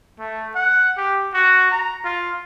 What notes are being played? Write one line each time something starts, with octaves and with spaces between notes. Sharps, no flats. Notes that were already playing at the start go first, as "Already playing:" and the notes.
A3
F#5
G4
F#4
A#5
F4